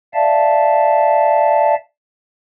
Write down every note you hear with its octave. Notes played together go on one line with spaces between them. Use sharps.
D5 E5 F5 A5